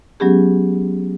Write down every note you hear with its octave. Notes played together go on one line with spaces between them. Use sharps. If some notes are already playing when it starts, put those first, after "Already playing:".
F#3 G#3 B3 C#4 G4 G#4